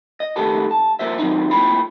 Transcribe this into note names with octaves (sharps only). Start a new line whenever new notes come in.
D#5
D#3 A3 B3 G4 A4 A5
A5
A#3 F4 C5 E5
D#3 F#3 G#3 C4 D#4 F4
A#3 E4 F4 G5 B5